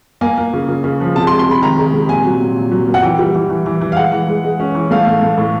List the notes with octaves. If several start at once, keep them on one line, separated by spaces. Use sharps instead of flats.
A#3 G#5
A#3
C#3
C#3
C#3
F3
C3 A5
C6
G#3
C6
G#3 B5
D#3 A#5
G#3
C3
A#2 G#5
F#3
A#2
A#2
F#3
A#3
F#5
E3 G5
G3
E3
E3
E3
E3
F5
G#3 F#5
E3
G#3
G#3
C#4
E3
A3 F5
A2
A2
A2